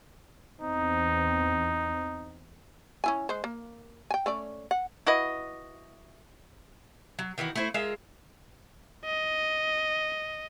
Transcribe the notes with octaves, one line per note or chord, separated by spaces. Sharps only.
E2 C4 D#4
C#4 E4 G#5
G#3 C5
A#3
G5 G#5
A3 C#4 D5
F#5
E4 F#4 B4 D#5
F#3
D#3 E3 B3 F#4
A3 E4 C5
G#3 F4 A#4 E5
D#5